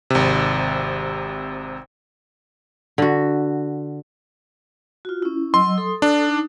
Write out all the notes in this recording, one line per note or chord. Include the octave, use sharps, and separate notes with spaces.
G#1 C3
D3 F#4
F4 F#4
C#4 E4
F#3 D#5 C6 E6
A4 D#6
D4
D#4